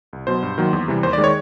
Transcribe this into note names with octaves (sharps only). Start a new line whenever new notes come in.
C2
B2 F#3 C5
G2
D#3 F#3 A#3
E2
C3 E3 G3
D#2 C5
D5
D#3 G#3
C#5